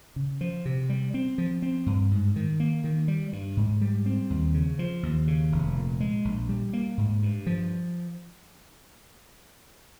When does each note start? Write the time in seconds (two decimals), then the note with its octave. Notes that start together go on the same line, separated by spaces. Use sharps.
0.16 C#3
0.41 F3
0.65 C3
0.89 G3
1.14 C4
1.38 F3
1.62 C4
1.86 G2
2.11 G#2
2.36 D#3
2.60 A#3
2.84 D#3
3.08 G3
3.33 G2
3.57 G#2
3.81 G3
4.06 C4
4.30 D#2
4.54 C#3
4.79 F3
5.03 D#2
5.27 C#3
5.52 F1
5.77 A#2
6.00 G#3
6.25 A#1
6.49 G3
6.73 A#3
6.98 G#2
7.22 G2
7.46 F3